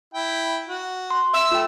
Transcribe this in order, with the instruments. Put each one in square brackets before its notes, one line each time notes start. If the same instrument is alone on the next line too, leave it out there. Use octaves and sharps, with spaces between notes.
[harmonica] E4 G5
F#4
[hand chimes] C6
[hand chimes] E5 [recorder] E6
[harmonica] A3 [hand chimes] F4 G5